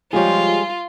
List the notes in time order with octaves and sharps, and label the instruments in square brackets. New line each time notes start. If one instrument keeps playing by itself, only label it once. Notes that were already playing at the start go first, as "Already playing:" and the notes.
[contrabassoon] F3 [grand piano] G3 G#3 G4 [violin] F4 [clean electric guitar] G#4 C#5